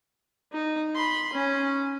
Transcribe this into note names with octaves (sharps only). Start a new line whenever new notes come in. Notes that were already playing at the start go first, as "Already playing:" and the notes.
D#4
B5 C6
C#4